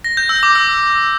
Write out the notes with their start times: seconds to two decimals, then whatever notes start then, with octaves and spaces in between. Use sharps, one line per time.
0.04 A#6
0.17 G6
0.29 E6
0.43 D6
0.55 E6